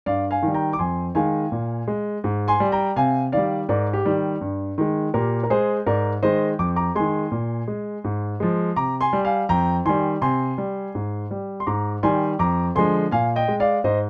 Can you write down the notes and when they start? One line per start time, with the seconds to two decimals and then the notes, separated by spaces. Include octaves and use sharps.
0.06 G2 D5 F5
0.31 F5 G#5
0.43 D#3 G3
0.54 G5 A#5
0.73 D6
0.79 F2 G#5 C6
1.15 D#3 G#3 F5 G#5
1.52 A#2
1.88 G#3
2.24 G#2
2.48 G#5 C6
2.60 G3
2.72 G5 A#5
2.96 C3 F5 G#5
3.32 D#3 G3 D5 F5
3.69 G#2 A#4 D5
3.93 G4
4.05 D#3 G3
4.41 G2
4.78 D#3 G#3
5.14 A#2 G4 A#4
5.43 A#4
5.50 G#3 G#4 C5
5.86 G#2 A#4 D5
6.23 D#3 G#3 C5 D#5
6.59 F2 D6
6.76 A#5 D6
6.95 D#3 G#3 G#5 C6
7.32 A#2
7.68 G#3
8.04 G#2
8.40 F3 G#3
8.76 C3 A#5 D6
9.01 G#5 C6
9.13 G3
9.25 F5 G#5
9.49 F2 G5 A#5
9.85 D#3 G3 G#5 C6
10.21 C3 G#5 C6
10.58 G3
10.95 G#2
11.31 G3
11.60 C6
11.67 G#2 A#5 D6
12.03 D#3 G3 G#5 C6
12.39 F2 A#5 D6
12.75 D3 F3 G#3 G#5 C6
13.11 A#2 F5 G#5
13.36 D#5 G5
13.48 G#3
13.60 D5 F5
13.84 G#2 C5 D#5